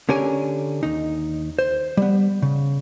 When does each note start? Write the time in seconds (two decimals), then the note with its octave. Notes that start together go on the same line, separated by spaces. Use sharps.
0.09 D3 C#4 G4 A#4 C#5 G#5
0.83 D#2 D#4
1.59 C5
1.97 G3 B3
2.42 C#3